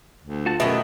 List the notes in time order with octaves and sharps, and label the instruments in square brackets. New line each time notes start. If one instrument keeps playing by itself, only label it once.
[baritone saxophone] D2
[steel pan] F4 [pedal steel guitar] F#4 F#5 A5
[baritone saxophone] F#2 [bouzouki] B2 D#3 [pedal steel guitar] A3 G4 [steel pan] E5